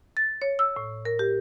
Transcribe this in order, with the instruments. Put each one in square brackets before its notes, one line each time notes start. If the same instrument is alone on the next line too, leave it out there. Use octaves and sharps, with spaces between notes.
[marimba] A6
C#5
E6
A2
A#4
G4